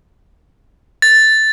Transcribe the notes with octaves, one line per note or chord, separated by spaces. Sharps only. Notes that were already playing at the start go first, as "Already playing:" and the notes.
A6